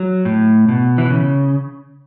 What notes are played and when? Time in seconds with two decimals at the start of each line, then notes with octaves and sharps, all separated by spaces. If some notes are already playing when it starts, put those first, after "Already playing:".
Already playing: F#3
0.25 A2
0.69 B2
0.98 E3
1.10 C#3